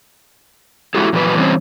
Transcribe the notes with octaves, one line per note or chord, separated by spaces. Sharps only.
G#3 A3 E4 F#4 G4 A4
F2 A#2 E3 F#3 B4
E3 G3 C4 C#4